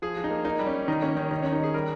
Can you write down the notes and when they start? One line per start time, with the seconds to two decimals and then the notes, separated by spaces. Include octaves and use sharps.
0.02 F3 G#4
0.17 F3
0.24 D#4
0.31 A#3
0.45 A#3 D#4
0.59 G3
0.67 C#4
0.74 G3
0.88 D#3 D#4
1.02 A#3 C#4
1.17 D#3 C#4
1.31 D#3 D#4
1.42 D#3 C#4
1.52 D#4
1.60 D#3 G#4
1.74 G3 A#4